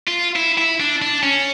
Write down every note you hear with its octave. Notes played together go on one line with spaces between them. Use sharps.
F4
E4
E4
D4
D4
C#4